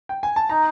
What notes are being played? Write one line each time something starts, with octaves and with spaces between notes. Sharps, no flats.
G5
G#5
A5
D#4 A#5